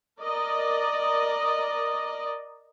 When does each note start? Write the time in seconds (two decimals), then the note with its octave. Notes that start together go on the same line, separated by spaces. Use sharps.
0.21 A#4 D5 D#5